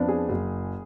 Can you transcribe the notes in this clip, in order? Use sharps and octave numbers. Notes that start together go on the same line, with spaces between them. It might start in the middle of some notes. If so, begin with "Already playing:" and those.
Already playing: F2 F3 B3 D4
G#4
F#1